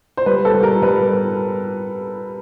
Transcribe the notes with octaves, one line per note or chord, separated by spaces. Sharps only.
C5
G3 B4
A4
G3
A#4
G3 B4